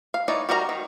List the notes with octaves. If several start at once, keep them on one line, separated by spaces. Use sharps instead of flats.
F5
E3 D#4 C#5 D5
G3 F#4 A#4 D#5 A#5
D#3